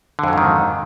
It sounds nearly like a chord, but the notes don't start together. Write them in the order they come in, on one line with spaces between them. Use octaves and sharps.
D3 F2 F#3 G#2 D#3